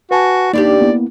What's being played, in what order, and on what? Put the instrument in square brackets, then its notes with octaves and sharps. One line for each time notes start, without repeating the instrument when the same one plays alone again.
[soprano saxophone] F#4 [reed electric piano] B4 G#5 A5
[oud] D#2 D4 G4 [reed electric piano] A#3 D#4 [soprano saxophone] D5
[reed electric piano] A#3 B3 E4